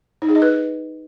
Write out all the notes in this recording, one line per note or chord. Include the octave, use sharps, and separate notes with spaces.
D#4
G#4
D#5
B4